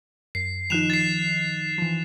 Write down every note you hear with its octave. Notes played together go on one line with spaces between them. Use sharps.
F#2 C7
D#3 F3 D#4 F#6 E7 F7
A6 C7
E3 F3